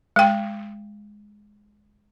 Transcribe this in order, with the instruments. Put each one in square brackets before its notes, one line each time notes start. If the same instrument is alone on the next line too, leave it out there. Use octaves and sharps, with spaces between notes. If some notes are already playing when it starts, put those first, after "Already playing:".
[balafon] G#3 G5